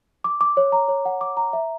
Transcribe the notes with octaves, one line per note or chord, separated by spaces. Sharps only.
D6
D6
C#5
A#5
C#5
F#5
D6
A#5
E5